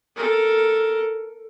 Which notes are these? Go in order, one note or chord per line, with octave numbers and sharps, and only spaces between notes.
A4 A#4